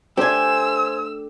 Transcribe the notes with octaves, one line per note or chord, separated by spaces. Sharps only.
A3 D4 G4 C5 G#5 E6